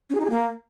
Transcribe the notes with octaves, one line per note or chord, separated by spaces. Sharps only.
C#4
G#4
D#4
G#4
A#3